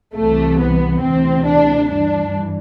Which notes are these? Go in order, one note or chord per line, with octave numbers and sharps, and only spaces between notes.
C2 C3 E3 A3
B3
D2 C3 E3 C4
D4
G2 E3 D4